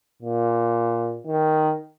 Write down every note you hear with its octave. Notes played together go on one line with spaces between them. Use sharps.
A#2
D#3